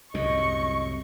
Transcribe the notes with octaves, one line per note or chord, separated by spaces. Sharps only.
C2 F#2 A2 D#5 C#6